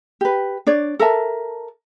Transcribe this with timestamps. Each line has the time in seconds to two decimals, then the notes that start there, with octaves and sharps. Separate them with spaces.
0.21 G4 B4
0.67 D4 C#5 D5
0.99 A4 A#4 E5 A5